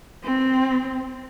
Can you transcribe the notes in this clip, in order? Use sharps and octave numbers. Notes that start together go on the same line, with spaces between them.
C4